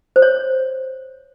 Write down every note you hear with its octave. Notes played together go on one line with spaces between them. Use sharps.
C5
C#5